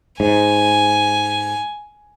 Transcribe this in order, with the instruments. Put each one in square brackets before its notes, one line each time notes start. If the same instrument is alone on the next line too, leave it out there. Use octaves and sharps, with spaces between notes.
[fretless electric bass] G#2 [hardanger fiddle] G#5